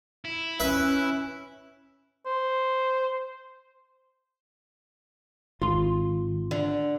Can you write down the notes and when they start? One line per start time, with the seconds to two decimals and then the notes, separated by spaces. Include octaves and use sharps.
0.25 E4
0.60 C#4 B4 E5
2.26 C5
5.62 G#1 F4 C6
6.51 D3